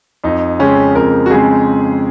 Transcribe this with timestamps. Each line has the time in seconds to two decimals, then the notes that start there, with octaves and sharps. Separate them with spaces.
0.24 F2 D#4
0.59 C#3 G#3 C4 C#4
0.95 F2 A#4
1.26 F#4
1.31 C#3 G#3 C4 G#4